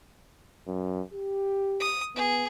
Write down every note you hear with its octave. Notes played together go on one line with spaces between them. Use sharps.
F#2
G4
D#6
B3 G#4